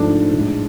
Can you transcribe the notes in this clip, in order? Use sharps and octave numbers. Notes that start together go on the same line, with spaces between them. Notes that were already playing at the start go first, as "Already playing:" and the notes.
Already playing: G#2 F3 A3 D4
A2 G#3